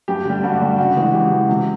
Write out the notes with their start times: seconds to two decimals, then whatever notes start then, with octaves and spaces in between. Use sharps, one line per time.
0.08 G2 G4
0.25 D3 G3
0.43 G2 F#4
0.62 D3 G3
0.78 C#3 F#4
0.96 E3 G#3
1.14 C#3 G4
1.31 E3 G#3
1.49 C3